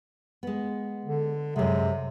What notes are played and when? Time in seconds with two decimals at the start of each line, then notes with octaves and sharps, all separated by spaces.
0.43 G#3 B3
1.05 D3
1.56 F#2 C3 G#3